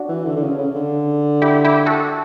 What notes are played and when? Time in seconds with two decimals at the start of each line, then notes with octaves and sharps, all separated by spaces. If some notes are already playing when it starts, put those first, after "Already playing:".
Already playing: D4 F#4
0.09 E3
0.26 D3
0.37 D3
0.43 C#3
0.59 C#3
0.75 D3
1.42 E4 G4
1.65 E4 G4
1.86 F#4 A4